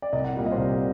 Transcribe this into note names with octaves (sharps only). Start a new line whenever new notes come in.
D5
C2 D#5
F#5
A#2 G3 A#3 F#5
D#5
C5
C2 D5